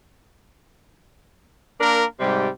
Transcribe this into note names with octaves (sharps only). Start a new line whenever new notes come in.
A#3 D4 A#4
G#2 C3 G3